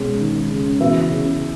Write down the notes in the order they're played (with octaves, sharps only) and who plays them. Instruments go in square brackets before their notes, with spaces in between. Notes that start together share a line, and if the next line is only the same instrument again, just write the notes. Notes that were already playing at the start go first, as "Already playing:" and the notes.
Already playing: [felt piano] B2 G#3 C#4
[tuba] D#3
C#3
[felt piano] E3 B3 F#4 B4 E5
[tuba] C#3